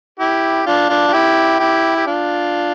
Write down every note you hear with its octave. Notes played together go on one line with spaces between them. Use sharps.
E4 G4
D4 F4
D4 F4
F4
E4 G4
E4 G4
G4
D4 F4